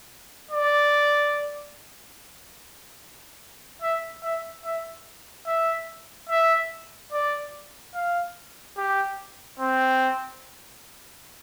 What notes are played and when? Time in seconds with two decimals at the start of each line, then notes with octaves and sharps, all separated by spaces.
0.51 D5
3.82 E5
4.23 E5
4.65 E5
5.47 E5
6.29 E5
7.12 D5
7.95 F5
8.77 G4
9.60 C4